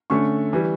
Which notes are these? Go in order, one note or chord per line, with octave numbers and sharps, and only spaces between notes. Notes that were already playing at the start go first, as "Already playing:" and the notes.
D3 A3 C#4 C#6
E3 G3